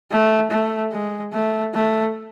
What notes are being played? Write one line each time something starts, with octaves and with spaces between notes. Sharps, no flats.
A3
A3
G#3
A3
A3